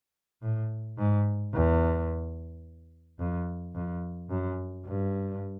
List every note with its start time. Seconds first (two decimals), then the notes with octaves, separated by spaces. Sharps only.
0.42 A2
0.98 G#2
1.54 E2
3.19 F2
3.75 F2
4.30 F#2
4.86 G2